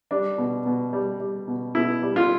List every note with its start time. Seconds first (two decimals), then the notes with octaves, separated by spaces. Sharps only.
0.11 G3 D4
0.38 B2
0.66 B2
0.93 G3
1.20 G3
1.48 B2
1.75 B2 E4
2.02 G3
2.16 F4